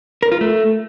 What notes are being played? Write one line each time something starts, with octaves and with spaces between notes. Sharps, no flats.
A#4
F4
A3